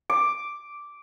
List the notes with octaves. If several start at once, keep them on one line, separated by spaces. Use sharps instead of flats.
D6